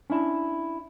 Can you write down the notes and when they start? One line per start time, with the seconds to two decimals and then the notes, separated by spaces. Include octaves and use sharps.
0.10 C#4 D4 E4 A5